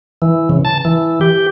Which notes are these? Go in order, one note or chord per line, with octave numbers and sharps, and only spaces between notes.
E3
C#3
A5
E3
G4